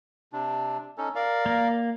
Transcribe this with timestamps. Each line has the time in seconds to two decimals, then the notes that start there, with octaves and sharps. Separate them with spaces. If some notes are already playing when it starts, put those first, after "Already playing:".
0.33 C3 D4
0.98 C#4 D#4 A4
1.15 A#4 D5 F5
1.46 A#3